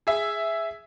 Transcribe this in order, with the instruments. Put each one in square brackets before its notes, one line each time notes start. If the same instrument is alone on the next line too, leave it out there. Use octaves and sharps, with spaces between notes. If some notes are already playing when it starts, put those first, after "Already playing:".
[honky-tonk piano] G#4 E5